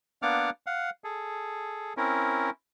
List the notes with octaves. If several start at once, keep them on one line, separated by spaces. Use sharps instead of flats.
A#3 B3 D4 F#5 D6 F6
F5 F#5
G#4 A4
C4 C#4 E4 A#4